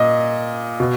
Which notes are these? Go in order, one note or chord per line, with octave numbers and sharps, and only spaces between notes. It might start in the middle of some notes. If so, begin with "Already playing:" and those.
Already playing: A#2 D#5
B2